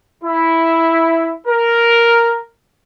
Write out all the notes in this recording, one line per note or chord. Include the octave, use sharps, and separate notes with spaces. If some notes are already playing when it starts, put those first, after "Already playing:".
E4
A#4